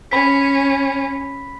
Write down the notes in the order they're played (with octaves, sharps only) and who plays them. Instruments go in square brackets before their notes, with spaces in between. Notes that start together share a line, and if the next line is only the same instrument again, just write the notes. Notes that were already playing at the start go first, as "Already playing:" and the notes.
[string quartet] C#4 [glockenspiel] B5 B6